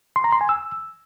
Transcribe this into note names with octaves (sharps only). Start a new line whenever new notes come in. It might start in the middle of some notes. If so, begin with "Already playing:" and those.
C6
A#5
C6
G#5
E6